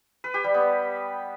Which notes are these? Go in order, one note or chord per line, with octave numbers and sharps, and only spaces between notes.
B4
G4
G3
B3